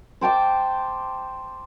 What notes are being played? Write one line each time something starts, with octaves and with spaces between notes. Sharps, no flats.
C5 G5 A5 D6